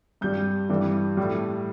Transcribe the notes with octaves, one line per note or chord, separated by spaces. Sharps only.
G2 G3 G6
G2 E3 G3
A2 G3